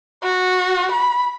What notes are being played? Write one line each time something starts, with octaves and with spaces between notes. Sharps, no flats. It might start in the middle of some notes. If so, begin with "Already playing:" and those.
F#4
B5